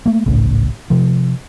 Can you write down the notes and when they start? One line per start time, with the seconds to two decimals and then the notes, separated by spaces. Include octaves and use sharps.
0.06 A3 A#3
0.26 G#1 C#2 A2 C#3
0.90 C3 F3